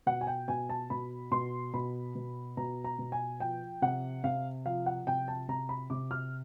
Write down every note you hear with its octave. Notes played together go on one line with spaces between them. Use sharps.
B2 F#5
G#5
G5
B2 G#5
A5
B2 B5
B2 C6
B2 B5
B2
B2 A#5
A#5
B2
G#5
F3 G5
C3 F#5
C3 F5
F3 F5
F#5
C3 G5
A5
C3 A#5
B5
C3 D6
F6